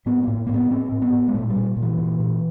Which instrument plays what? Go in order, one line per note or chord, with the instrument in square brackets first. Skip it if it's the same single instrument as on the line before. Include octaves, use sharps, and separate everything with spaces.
[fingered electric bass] A2 B3
A2 A#3
A#3
A2 B3
A2 C4
A2
B3
A2
G#3
A#2 A3
G3
A#2
A#2
E3
A#2
A#2